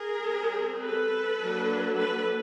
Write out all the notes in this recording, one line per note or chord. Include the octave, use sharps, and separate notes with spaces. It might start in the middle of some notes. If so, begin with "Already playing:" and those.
Already playing: G#4 A#4
G3 C4
A4 B4
F#3 A#3 D4
A4 B4